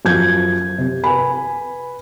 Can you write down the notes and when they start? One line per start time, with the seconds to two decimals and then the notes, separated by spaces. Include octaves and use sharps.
0.05 F#2 F3 G6 G#6
0.78 C3
1.04 B4 G#5 B5